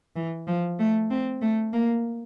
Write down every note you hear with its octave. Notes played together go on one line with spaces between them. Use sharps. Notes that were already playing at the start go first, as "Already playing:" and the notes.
E3
F3
A3
C4
A3
A#3